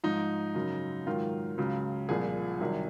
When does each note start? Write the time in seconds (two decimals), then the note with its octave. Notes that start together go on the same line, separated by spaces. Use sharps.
0.04 G#2 F3 D#4
0.55 F#2 C#3 F#3
1.07 G#2 D#3 F#3 F4
1.58 C#2 C#3 F#3
2.09 C2 A#2 F3 G#4
2.61 C2 C3 D#3 F#3